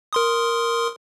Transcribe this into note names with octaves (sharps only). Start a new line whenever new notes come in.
A#4 C6 D#6